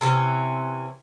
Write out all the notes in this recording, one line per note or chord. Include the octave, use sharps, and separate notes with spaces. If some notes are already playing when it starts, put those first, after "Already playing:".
C3 E3 A#3 C#4